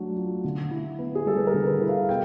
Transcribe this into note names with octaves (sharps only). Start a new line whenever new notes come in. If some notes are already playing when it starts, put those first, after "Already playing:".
Already playing: F#3 A3 D4
F4
D3
E4
B3
G#4
G3 A4
B4
A#4
D3
B4
E4
F5
B2 G5